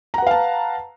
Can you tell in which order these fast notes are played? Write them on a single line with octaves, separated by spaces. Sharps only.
A#5 F#5 B4 F5 A5